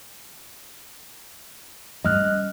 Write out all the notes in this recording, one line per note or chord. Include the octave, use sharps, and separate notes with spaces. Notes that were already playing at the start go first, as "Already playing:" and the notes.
G3 C#4 D#5 F6 F#6